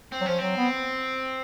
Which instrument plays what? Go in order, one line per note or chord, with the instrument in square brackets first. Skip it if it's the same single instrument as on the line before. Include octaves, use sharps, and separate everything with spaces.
[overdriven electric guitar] C4
[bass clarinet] F#3
[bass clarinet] F3 [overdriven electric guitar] C#4
[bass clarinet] F#3 [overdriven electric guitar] C4
[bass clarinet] B3